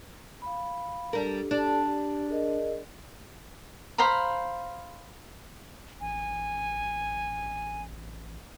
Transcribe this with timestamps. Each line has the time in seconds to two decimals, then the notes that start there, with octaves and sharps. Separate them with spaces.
0.42 F5 B5
1.13 G3 D4 G4 A4 A#4
1.51 D4 G4 A4
1.87 G4
2.28 G#4 A#4 D#5
3.98 C5 F5 A#5 B5
6.01 A1 G#5